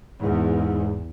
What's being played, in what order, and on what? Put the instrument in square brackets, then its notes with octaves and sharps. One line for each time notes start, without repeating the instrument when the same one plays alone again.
[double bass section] E2 [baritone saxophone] G#2